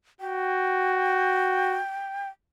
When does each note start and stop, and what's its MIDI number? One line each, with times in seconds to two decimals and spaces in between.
0.20 1.81 66
0.20 2.29 79